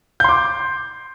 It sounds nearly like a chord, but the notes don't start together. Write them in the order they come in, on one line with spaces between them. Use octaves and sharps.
G6 C6 D6